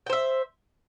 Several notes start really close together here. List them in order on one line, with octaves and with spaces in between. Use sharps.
G5 C5 E5